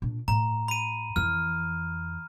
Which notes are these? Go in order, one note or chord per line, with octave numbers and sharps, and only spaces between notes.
A#2 D4
A2 A#5
B5 D#7
F2 E3 F6